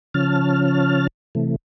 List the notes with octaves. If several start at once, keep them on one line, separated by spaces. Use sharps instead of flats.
C#3 F3 C#4 A5 F6
C3 E3 A3